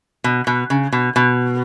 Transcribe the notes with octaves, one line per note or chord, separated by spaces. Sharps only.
B2
B2
C#3
B2
B2